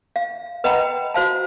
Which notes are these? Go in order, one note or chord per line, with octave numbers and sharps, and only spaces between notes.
F5
B4 D#5 F#5 G5 A#5 B5
F#4 C5 F5 A5